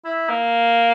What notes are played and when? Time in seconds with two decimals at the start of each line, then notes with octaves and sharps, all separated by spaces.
0.05 E4
0.30 A#3